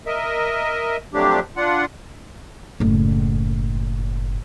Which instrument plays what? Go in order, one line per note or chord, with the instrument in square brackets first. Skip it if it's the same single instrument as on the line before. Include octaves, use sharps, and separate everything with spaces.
[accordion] A#4 D#5 E5
C3 F3 F#3 A3 D4 G4
D4 F4 F#5
[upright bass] F#1 A2